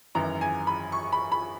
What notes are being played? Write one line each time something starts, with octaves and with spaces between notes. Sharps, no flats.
G#1 F#2 E3 A#5
G#5
B5
C#6
B5
B5